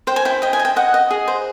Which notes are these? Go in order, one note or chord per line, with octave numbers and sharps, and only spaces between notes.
C5 G5
G#5
E4 G5
D#5 G5
G#5
D#5
G5
D#5 F#5
D#5
G#4
C5